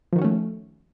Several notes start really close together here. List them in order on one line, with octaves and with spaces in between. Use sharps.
F3 D#3 F#4 C#4 A3